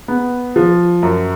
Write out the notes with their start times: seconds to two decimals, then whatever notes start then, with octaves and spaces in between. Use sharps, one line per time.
0.08 B3
0.56 F3
1.03 F#2